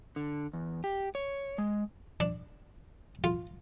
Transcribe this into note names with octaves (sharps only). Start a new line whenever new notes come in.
D3
E2
G4
C#5
G#3
D4
F4